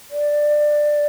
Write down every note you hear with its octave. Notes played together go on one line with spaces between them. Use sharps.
D5